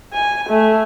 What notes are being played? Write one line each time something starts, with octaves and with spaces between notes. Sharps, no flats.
G#5
A3